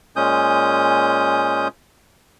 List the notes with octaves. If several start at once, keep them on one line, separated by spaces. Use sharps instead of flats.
A#2 G#3 C#4 D#6 G6